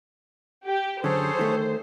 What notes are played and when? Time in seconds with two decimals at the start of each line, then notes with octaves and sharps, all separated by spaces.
0.66 G4
1.04 F#2 D3 G#4 A4 C5 C#5
1.39 D#3 A3